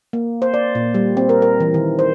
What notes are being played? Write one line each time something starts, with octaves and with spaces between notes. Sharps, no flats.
A#3
C5
D5
A#2
G3
C4
A#4
A#4
E3
D#3
C5